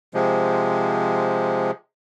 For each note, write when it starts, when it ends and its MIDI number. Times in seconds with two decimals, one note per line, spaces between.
0.14 1.71 48
0.14 1.71 53
0.14 1.71 56